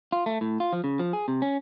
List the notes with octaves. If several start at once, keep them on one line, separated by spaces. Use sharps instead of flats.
F4
A3
A2
F4
F3
C#3
F3
G#4
C3
C#4